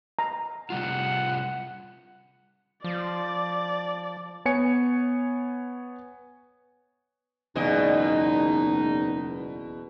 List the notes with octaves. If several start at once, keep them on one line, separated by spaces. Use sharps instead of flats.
A#5
C3 G3 F4 F#5
F3 D5
B3 C#5 G#5 C#7
F#1 E2 B2 G#3 D#4 D#5 G5 G#5